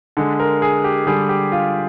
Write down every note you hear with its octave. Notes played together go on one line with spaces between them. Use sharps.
D3 G#3
A#4
G#4
G4
D3 G3 G#4
G4
F4